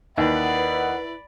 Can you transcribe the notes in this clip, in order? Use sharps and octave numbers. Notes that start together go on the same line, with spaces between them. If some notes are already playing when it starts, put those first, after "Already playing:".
D#2 E4 A#4 B4 D5 D#5 F#5 B5